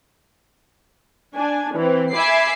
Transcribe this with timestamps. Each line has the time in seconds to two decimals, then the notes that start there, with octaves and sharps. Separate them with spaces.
1.35 D4 G#5
1.75 E3 C4
2.12 E5 G#5 B5 D6 C7